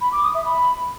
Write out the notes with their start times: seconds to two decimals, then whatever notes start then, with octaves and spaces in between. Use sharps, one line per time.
0.01 B5
0.12 D6
0.23 D#6
0.34 E5
0.45 B5